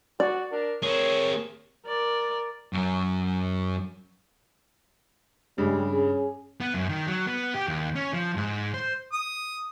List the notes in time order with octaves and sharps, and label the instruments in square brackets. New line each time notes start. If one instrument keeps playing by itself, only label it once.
[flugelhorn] F#4 [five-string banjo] D5
[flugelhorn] D4 [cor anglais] A#4
[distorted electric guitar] C4 G#4 [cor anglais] A#4 [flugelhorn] C#5
[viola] A#4 D5
[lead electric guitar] F#2 F#3
[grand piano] G2 C#3 [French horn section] G3 G#3
[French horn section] C#4 G#4
[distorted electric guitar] B3
F#2
D#3
F#3
B3
G4
D#2
C#4
F3
G#2
C5
[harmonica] D#6